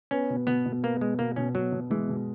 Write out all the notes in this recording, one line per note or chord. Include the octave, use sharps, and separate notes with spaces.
B3 C#4
B2
B2 B3
B2
A#3 B3
G#3 B3
B2 A#3
B2 C#4
B2 F#3
B2
E3 G#3
B2